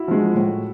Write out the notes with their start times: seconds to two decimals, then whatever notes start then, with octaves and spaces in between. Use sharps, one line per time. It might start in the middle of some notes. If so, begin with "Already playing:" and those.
Already playing: E4 F#4
0.08 F3 G#3
0.35 A2